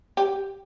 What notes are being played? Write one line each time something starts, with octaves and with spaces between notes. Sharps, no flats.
G4